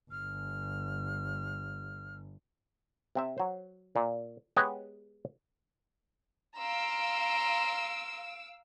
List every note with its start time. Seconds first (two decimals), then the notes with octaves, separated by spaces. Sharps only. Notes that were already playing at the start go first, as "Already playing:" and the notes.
0.11 G1 F6
3.15 C3 C4 E5
3.38 F#3 C5
3.96 A#2
4.56 G#3 B3 G4 B4 C#5 D#5
6.57 F5 A#5 C6 E6 D7